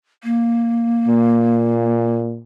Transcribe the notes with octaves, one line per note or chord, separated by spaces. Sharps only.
A#3
A#2